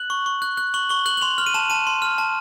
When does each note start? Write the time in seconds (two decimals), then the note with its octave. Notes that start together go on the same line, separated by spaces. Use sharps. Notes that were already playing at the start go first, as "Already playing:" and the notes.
Already playing: F#6 F#7
0.10 C#6
0.26 C#6
0.42 F#6
0.57 F#6
0.74 C#6 F#7
0.89 C#6 G7
1.06 F#6 F#7
1.17 F#7
1.22 C6 F7
1.38 F6 F#7
1.46 D#7
1.54 A5 E7
1.70 A5 D#7
1.87 C6
2.02 F6
2.18 A5